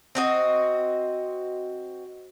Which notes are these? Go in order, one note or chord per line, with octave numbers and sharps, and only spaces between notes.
C4 F#4 D#5